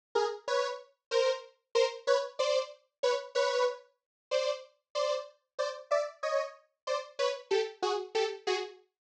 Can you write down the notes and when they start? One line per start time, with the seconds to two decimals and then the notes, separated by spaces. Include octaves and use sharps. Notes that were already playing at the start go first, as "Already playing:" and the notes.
0.15 G#4 A#4
0.48 B4 C#5
1.11 A#4 C5
1.75 A#4 C5
2.07 B4 C#5
2.39 C5 D5
3.03 B4 C#5
3.35 B4 C#5
4.31 C5 D5
4.95 C5 D5
5.59 C5 D5
5.91 D5 E5
6.23 C#5 D#5
6.87 C5 D5
7.19 B4 C#5
7.51 G4 A4
7.82 F#4 G#4
8.15 G4 A4
8.47 F#4 G#4